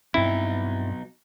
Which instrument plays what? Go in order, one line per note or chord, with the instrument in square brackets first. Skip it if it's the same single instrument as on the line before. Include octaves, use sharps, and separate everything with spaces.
[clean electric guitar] B1 B2 D#4 [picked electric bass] G2 C4 [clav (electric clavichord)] E4